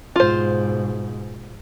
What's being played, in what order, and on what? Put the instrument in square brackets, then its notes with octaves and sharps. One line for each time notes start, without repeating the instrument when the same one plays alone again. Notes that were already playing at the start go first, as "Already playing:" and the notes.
[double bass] G#2 B2 [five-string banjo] F4 C5